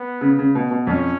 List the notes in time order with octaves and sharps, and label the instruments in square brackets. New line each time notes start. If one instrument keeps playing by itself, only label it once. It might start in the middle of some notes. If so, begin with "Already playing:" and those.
Already playing: [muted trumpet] B3
[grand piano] C#3
C#3
B2
B2
[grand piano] F2 [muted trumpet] C#4